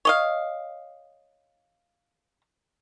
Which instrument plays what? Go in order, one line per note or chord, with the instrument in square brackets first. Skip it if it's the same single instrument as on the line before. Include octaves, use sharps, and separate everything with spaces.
[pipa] C#5 D#5 F5